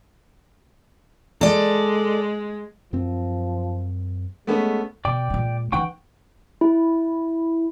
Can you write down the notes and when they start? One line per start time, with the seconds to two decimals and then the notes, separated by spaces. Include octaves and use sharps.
1.41 G#3 A4 D5
2.93 F#2 F3 C4
4.47 G#3 A3 B3 C#4
5.05 B2 D5 G5 D6
5.30 A#2 G#3
5.72 E3 D#4 F#5 G5 C#6
6.61 E4